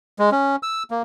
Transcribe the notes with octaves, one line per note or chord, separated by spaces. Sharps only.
G#3
C#4
E6
A#3